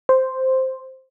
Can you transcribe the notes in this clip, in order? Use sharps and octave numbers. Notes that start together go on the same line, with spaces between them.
C5